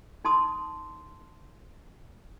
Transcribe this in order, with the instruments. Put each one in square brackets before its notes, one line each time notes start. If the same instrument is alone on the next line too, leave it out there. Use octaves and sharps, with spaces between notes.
[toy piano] D#4 A5 C6 D#6